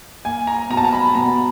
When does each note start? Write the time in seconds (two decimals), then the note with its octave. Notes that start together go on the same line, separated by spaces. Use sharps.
0.25 A#3 G#5
0.47 A#5
0.70 B2 A#5
0.77 A5
0.85 A#5
0.93 B5
1.15 B2 A#5